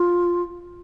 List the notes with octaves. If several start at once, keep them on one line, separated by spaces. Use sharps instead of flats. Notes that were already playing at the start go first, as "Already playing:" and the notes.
Already playing: F4